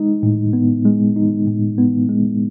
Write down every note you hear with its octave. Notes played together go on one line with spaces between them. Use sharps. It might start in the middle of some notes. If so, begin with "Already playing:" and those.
Already playing: G#3 D#4
A2
B3
G#3
D#4
A2
B3
G#3